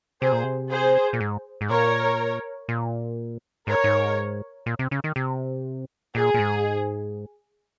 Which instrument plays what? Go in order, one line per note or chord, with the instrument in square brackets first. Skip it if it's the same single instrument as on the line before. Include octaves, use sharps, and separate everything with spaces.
[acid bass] C3 [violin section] G#4 C5
[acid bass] A#2
C3
[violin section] G#4 C5
[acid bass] A#2
G#2
G#2
[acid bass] A#2 [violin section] A#4 C#5
[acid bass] A#2
[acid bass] G#2 [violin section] A#4 C#5
[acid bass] G#2
A#2
C3
C#3
D#3
C3
[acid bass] A#2 [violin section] G#4
[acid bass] A#2
G#2